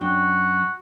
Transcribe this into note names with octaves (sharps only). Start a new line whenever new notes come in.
F#2 D4 F#4 G5